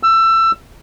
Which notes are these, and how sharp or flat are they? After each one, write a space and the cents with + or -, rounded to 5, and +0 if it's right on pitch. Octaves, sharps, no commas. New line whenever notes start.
E6 +20